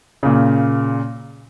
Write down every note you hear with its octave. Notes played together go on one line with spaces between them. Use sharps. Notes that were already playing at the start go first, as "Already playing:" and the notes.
A#2 C#3